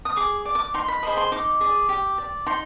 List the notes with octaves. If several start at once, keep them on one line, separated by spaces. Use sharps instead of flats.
D#6
G#4 D6
D5
D6
D#4 C6
B5
G#4 C5 D#5 B5
C6
D#4 D6
G#4 D5
G4
D5
D#4 C6